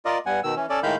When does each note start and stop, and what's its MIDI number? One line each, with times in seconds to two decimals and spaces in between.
0.05 0.18 65
0.05 0.18 70
0.05 0.18 74
0.05 0.18 75
0.26 0.40 43
0.26 0.40 55
0.26 0.40 59
0.26 0.40 78
0.26 0.40 80
0.44 0.55 47
0.44 0.55 51
0.44 0.55 88
0.56 0.66 52
0.56 0.66 61
0.70 0.80 61
0.70 0.80 69
0.70 0.80 74
0.83 0.96 45
0.83 0.96 51
0.83 0.96 56
0.83 0.96 77
0.83 0.96 83
0.83 0.96 91